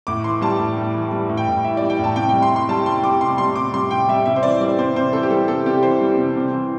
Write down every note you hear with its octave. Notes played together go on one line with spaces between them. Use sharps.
A2 D6
E3 C6
G3 A5
A2
A2
E3
G3
A2
G5
A2
E3 E5
G3 D5
G5
A2 A5
C3 G5
G3 G5
C6
C3
C6
G3 A5
C3 C6
G3 D6
C3 C6
G3 C6
C3 D6
G3 C6
C3 G5
G3 E5
C3 E5
C5
E3 D5
G3 D5
C3 C5
C3 C5
E3 A4
G4
G3 A4
C3 A4
C3 G4
E3 C5
G3
C3
C3
E3